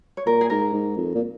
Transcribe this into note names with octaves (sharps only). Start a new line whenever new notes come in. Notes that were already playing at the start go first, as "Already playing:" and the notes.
C#5
A#2 A#4
G#4
G#2 A#4
G#2
F2
A#2